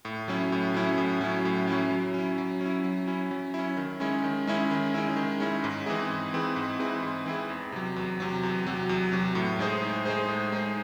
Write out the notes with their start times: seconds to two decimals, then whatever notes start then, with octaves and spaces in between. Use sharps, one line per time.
0.05 A2
0.28 F#3 C#4 E4
0.52 A2
0.74 F#3 C#4 E4
0.98 A2
1.21 F#3 C#4 E4
1.45 A2
1.67 F#3 C#4 E4
1.91 F#3
2.14 C#4 E4
2.38 F#3
2.61 C#4 E4
2.84 F#3
3.07 C#4 E4
3.31 F#3
3.54 C#4 E4
3.77 D#3
4.00 G#3 C#4 E4
4.24 D#3
4.47 G#3 C#4 E4
4.71 D#3
4.94 G#3 C#4 E4
5.16 D#3
5.40 G#3 C#4 E4
5.64 G#2
5.86 E3 C4 E4 G#4
6.10 G#2
6.34 E3 C4 E4 G#4
6.56 G#2
6.80 E3 C4 E4 G#4
7.02 G#2
7.26 E3 C4 E4 G#4
7.50 E2
7.72 C3 F#3
7.96 E2
8.20 C3 F#3
8.43 E2
8.67 C3 F#3
8.89 E2
9.12 C3 F#3
9.35 A2
9.59 G#3 D#4 G#4 C5
9.82 A2
10.05 G#3 D#4 G#4 C5
10.28 A2
10.52 G#3 D#4 G#4 C5